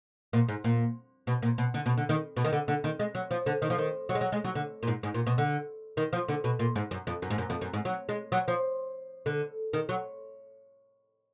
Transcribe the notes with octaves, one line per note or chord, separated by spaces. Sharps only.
A#2
G#2
A#2
B2
A#2
B2
D3
B2
D3
D#3
B2
D#3
D3
D3
D#3
G#3
F#3
F3
D3
D#3
F3
D#3
F#3
G#3
F#3
G#3
F#3
D3
A#2
G#2
G#2
A#2
B2
D3
D#3
F3
D3
B2
A#2
G#2
F#2
F2
F#2
G#2
F#2
F2
F#2
G#2
F#3
G#3
F#3
F3
D3
D#3
F#3